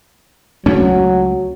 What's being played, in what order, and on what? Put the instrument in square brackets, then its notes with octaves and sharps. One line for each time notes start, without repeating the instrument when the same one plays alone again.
[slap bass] C#2 A3 C#4 [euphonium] F#3